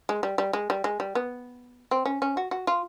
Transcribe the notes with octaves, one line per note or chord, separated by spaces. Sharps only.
G#3
G3
G3
G#3
G3
G#3
G3
B3
C4
C#4
C#4
F#4
F#4
F4